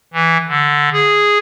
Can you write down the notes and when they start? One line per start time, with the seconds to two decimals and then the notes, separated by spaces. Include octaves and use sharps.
0.13 E3
0.48 D3
0.93 G#4